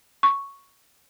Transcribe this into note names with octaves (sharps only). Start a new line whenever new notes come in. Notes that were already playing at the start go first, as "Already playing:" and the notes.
C#6